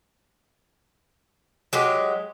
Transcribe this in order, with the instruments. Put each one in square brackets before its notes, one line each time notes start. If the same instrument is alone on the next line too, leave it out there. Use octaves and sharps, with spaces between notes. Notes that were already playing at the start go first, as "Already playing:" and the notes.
[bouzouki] F#3 G#3 G4